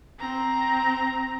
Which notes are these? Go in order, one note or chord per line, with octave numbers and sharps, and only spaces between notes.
C4 A#5